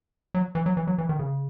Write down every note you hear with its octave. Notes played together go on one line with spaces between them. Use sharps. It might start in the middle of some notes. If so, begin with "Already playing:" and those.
F#3
E3
F#3
E3
F#3
E3
D#3
C#3